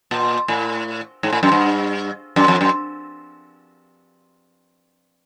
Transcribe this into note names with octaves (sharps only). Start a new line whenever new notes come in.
A#2
A2
G#2
A2
F#2
G2
F#2
F2
F#2